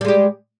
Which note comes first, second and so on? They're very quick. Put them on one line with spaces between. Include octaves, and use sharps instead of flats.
G3 G#3 G4